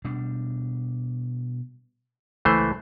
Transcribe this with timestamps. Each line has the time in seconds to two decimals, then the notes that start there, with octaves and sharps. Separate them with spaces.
0.05 B2 G3 D4
2.45 C#2 E3 A3 C5